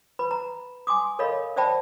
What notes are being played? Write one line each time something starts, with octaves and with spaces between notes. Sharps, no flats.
B4 B5
A#5
G#5 C6 D6 D#6
A4 A#4 C#5 D#5 F5 B5
C5 D5 E5 G5 A5 B5